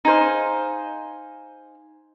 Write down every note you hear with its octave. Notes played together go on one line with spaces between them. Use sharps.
D#4 G#4 C5 F5